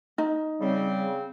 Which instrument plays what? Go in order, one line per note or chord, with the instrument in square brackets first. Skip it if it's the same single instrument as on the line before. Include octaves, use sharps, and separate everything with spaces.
[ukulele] D#4
[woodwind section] C#3 C4 [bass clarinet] G3